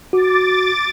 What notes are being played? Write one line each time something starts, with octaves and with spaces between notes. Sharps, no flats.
F#4 D6 A6